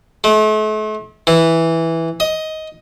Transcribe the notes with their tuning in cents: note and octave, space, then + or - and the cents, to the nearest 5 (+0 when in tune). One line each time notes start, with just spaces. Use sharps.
A3 -40
E3 -5
D#5 +15